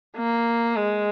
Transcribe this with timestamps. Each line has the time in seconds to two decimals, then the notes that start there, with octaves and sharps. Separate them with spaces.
0.17 A#3
0.76 G#3